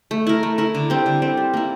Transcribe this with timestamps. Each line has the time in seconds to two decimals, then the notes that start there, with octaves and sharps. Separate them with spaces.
0.11 A3
0.27 E4 A#4
0.43 A3
0.58 E4 A#4
0.75 D3
0.90 G3 C4
1.06 D3
1.22 G3 C4
1.37 G3
1.54 A#3 E4